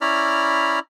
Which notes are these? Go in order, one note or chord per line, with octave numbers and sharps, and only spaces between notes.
C#4 E4 D5 A#5 B5 F6